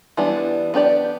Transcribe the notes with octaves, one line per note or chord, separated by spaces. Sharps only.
E3 G3 B3 D4
B3 D4 G4 D5